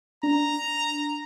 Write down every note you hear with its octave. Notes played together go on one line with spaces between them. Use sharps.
D4 A#5